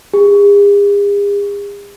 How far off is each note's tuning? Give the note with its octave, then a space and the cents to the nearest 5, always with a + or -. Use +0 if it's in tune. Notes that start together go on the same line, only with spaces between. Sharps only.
G#4 -45